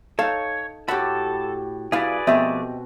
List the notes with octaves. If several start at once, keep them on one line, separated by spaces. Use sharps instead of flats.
D#4 A4 C#5 F5
A2 F#4 G4 A4 F#5 B5
C2 E4 F#4 G#4 B4 D5 F5
B2 F3 A3 C4 G4 D#5 E5